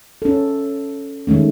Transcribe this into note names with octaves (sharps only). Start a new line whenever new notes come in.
C#4 A4
D#3 G#3 A3 C#4